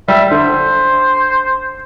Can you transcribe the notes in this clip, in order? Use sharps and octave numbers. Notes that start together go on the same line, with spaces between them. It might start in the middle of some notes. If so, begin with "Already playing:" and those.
G3 E5
D3 C5